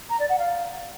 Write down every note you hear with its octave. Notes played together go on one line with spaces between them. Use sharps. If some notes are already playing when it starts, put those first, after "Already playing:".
A#5
D5
F#5
F5